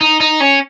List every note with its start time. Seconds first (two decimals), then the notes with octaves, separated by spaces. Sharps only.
0.01 D#4
0.20 D#4
0.40 C#4